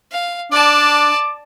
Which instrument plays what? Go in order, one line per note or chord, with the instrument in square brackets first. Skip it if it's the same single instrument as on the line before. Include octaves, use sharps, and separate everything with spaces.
[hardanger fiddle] F5
[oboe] D4 [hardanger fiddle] D5 A5 [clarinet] D6